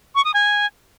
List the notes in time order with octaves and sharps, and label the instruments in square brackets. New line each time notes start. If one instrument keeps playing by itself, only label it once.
[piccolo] C#6
D#6
G#5